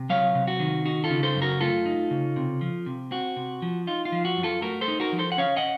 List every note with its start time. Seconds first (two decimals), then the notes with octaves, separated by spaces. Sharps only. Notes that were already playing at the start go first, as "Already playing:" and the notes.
Already playing: C3
0.09 F#3 C#5 F5
0.35 C3
0.47 F#4
0.60 D#3
0.85 D#4 F#4
1.04 F4 A4
1.10 C#3
1.23 A4 C5
1.35 F#2
1.42 F#4 A#4
1.61 A3 F4 A4
1.86 D#4
2.11 C#3
2.36 C3
2.61 F3
2.86 C3
3.11 C4 F#4
3.36 C3
3.62 F3
3.87 D#4 F4
4.05 F4
4.12 F3
4.25 F#4
4.37 F#2
4.43 F4 A4
4.62 A3 F#4 A#4
4.81 A4 C5
4.88 D#4
5.00 F#4 A#4
5.12 F3
5.19 A4 C5
5.32 F#5
5.38 C#4 C#5 F5
5.56 D#5 F#5